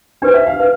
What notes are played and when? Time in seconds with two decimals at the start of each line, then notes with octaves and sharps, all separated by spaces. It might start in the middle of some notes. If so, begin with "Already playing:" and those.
0.22 D4 G4 B4 C5
0.34 E5
0.47 F5
0.59 B4 F5